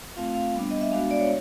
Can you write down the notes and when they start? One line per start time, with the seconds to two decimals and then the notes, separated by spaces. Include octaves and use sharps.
0.16 A3 C4 F4 F5
0.35 F5
0.54 G3 B3 D4
0.71 D#5
0.81 E5
0.92 G#3 B3 D4 F#4 F5
1.11 D5
1.20 C#5